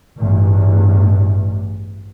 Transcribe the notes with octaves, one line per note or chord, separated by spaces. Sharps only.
A1 E2 G2